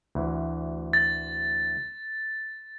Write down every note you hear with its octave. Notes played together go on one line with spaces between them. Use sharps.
D2 E3
A6